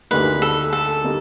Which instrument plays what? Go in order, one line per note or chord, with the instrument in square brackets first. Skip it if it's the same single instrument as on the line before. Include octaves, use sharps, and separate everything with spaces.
[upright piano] D2 D3 G3 A#3 D#4 [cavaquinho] B4
[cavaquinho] A4
A4
[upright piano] D3 G3 A#3 D#4